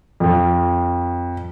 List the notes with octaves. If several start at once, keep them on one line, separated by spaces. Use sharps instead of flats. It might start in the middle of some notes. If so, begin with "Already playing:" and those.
F2